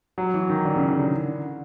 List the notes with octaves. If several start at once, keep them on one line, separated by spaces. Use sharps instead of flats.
F#3
E3
D#3
D3
C#3
D3
D3